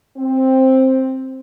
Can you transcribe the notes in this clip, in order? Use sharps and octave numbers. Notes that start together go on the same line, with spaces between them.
C4